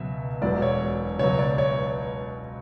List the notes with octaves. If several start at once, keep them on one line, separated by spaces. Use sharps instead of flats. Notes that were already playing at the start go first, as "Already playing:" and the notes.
Already playing: C#2 B2 F#3 E5
E1 E2 B2 F#3 D5
C#5
C#2 B2 F#3 C#5
D5
C#5